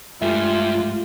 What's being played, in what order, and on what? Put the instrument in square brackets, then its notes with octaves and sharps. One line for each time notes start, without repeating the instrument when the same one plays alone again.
[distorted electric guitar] G2 [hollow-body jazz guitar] G#3 A3 G4 [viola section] F4 [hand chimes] E5